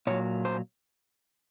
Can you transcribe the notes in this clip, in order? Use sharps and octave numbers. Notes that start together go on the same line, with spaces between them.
A#2 F#3 C#5
C5